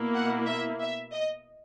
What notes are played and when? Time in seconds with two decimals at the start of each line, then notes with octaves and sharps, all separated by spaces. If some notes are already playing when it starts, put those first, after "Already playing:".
Already playing: B2 A#3 E4
0.15 F#5
0.46 E5
0.80 E5
1.13 D#5